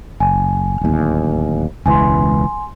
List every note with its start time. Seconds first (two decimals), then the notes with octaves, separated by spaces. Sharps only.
0.20 F#1 G#5
0.81 D1 D#2
1.86 E1 C#2 E3 G#5 C6